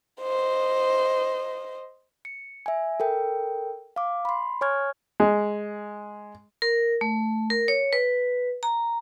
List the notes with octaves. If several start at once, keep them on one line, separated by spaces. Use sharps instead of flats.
C5 D#5
C#7
E5 G#5
A4 A#4 G5
F5 D6
B5 C6
C#5 G#5 C#6 F6 G#6
G#3
A#4
A3
A#4
C#5
B4
A#5